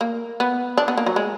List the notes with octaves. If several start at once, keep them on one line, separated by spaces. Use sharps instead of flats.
A#3
B3
D4
B3
A#3
F#3
G#3